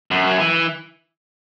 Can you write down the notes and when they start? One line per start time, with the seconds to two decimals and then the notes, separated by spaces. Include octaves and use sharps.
0.11 F#2
0.27 F#3
0.39 E3